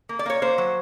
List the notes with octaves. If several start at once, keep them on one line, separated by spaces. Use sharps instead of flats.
A#3
D5
A#3 C#5
A#3 C5
F#3